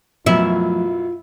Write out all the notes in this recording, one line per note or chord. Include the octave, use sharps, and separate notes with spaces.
F#2 B2 F3 F#3 A3 E4 F4